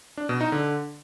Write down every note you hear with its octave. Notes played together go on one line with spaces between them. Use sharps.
D4
B2
D#4
D3